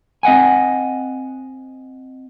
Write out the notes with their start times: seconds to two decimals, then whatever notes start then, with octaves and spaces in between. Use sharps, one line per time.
0.23 C4 D#5 F#5 G#5